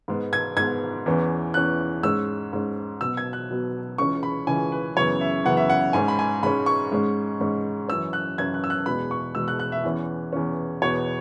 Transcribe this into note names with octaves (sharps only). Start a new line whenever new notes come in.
G#2 G#3 B3
G#6
G#2 G#3 B3 G#6
E2 E3 C#4
E2 E3 C#4 F#6
G#2 G#3 C#4 E6
G#2 G#3 C#4
B2 F#3 B3 E6
G#6
F#6
B2 F#3 B3
C#2 C#3 E3 C#4 C#6
B5
C#2 C#3 E3 C#4 G#5
B4
F#2 C#3 E3 B3 C#5
E5
F#2 C#3 E3 B3 F#5
E5
F#5
G#2 G#3 C#4 G#5
B5
G#5
G#2 G#3 C#4 B5
C#6
G#2 G#3 C#4
G#2 G#3 C#4
F#2 E3 C#4 E6
F#6
F#2 E3 C#4 G#6
F#6
E6
F#6
E2 B2 G#3 B5
C#6
E2 B2 G#3 E6
F#6
F#6
E5
E2 E3 C#4
E2 E3 C#4
E2 B2 B3 C#5